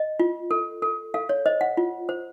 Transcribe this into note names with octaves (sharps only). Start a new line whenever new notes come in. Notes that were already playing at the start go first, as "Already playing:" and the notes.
Already playing: D#5
F4
A4
A4
A4 F5
C#5
C5 D#5
F#5
F4
C5